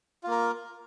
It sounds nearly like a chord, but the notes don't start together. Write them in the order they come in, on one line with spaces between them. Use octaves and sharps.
F4 A#3 A#4